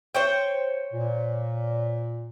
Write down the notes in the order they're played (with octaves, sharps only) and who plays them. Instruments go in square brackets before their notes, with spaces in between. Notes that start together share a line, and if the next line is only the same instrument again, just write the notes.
[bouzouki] C5 C#5 G5
[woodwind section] A#2